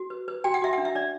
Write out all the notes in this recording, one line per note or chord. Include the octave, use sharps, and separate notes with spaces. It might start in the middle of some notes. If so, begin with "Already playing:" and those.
Already playing: F#4
B4
B4
F#4 G5
F#5
F#4 E5
D4 F#5
E5
D4 D5